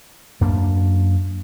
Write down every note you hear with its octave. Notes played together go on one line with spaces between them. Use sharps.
F#2 A#3 D4